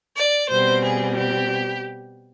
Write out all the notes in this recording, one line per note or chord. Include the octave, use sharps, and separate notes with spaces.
D5
B2 G3 C4 C5
G#4
G4